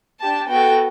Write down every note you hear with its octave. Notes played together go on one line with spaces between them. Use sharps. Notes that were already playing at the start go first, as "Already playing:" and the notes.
D4 G4 A5
B3 F#4 A4 G5